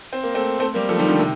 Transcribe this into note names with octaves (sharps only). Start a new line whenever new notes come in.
C4
A#3
A3 C4
A3 C4
G3 A#3
F3 A3
D#3 G3
D3 F3
C3 D#3